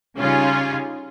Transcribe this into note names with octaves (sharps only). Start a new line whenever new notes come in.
C#3 G3 C#4 D#4 F4 G#4